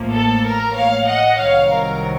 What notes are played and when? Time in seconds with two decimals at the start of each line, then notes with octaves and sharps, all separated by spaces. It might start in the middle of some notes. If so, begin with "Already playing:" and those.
Already playing: A1 A2 F3 A#3
0.12 A4
0.45 A#4
0.75 C#5 F5
1.06 D#5 F#5
1.38 C2 C3 D#3 F#3 C#5 F5
1.70 A#4